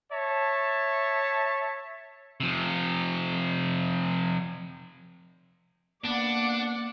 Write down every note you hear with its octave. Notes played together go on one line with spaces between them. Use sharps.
C#5 E5 A5
C3 F3
A#3 B3 D4 D5 F#5